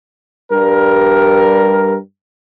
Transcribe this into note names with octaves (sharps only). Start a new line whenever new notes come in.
G2 G3 A#4